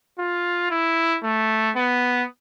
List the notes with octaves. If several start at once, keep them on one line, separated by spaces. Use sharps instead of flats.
F4
E4
A3
B3